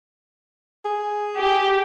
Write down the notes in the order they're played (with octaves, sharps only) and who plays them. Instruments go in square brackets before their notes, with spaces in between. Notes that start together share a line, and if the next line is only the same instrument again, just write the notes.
[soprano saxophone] G#4
[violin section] G4